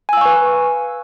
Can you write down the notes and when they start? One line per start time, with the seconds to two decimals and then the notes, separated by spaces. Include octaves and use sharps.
0.09 G#5
0.13 E6
0.17 F5
0.21 C#6
0.25 B4